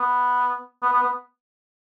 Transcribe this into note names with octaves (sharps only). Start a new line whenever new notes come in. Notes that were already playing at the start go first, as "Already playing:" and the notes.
Already playing: B3
B3
B3
B3